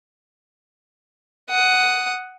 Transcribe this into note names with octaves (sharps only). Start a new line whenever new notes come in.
F#5 D#6